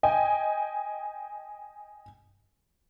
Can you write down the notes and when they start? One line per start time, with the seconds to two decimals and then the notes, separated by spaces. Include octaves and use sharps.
0.03 D#5 G5 G#5